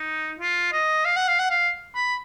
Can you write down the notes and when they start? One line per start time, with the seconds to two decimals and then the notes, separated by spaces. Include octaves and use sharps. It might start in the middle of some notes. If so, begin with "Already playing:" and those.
Already playing: D#4
0.39 F4
0.73 D#5
1.05 F5
1.17 F#5
1.28 F5
1.39 F#5
1.51 F5
1.95 B5